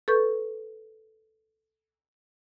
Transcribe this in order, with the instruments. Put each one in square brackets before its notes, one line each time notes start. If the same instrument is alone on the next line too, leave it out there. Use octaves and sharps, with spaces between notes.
[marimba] A4 B4 C#6 G6